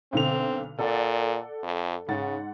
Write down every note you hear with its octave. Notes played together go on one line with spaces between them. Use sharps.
B1 D3 C4 F7
A#2 A4 D5 F#5
F2
G#2 C#3 F#5 A6